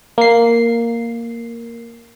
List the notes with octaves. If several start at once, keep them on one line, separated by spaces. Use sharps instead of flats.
A#3 C7